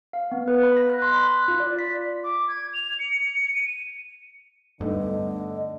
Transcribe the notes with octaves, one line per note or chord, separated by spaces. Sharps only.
F5
B3
B4
B5
A#6
F#6
C6
B5
F#6
F4
D5
B6
D6
G#6
F7
C#7
D#7
G2 D3 A3 B3 D#4 D#5